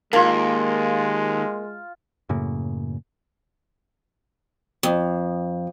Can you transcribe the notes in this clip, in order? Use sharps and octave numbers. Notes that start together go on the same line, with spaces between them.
D#2 G#3 A#3 F4 A5
F#2 A2 C#3 A#3
F2